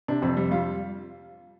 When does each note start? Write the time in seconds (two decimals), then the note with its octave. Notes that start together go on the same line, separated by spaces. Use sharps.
0.08 C3 D4
0.22 F2 C4
0.37 G3
0.51 G3 F4